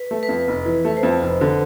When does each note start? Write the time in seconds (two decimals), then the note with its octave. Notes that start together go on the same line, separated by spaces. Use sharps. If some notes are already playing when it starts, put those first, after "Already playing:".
Already playing: B4
0.11 A3
0.23 B4
0.29 F2
0.48 F1
0.66 E3
0.85 A3 B4
0.97 C5
1.03 F2
1.22 F1
1.41 D3